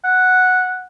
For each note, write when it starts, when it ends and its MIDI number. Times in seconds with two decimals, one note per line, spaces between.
0.04 0.85 78